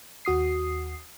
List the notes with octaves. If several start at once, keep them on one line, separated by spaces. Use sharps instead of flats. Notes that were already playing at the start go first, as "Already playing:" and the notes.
D#2 F#4 D#6 C7